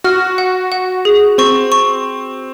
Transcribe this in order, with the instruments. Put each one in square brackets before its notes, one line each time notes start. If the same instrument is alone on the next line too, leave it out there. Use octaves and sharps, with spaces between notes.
[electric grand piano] F#4 [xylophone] F6
[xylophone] F#5
F#5
G#4
[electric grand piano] C4 [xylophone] C#6
[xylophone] C#6